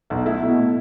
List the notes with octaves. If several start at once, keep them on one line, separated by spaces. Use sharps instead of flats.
B1
A3 E4
B2
A2